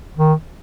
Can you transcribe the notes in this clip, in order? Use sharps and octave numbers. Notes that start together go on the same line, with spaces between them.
D#3